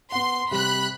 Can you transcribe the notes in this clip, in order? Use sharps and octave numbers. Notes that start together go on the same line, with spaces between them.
B3 F#5 C6
C3 G3 B5 F#6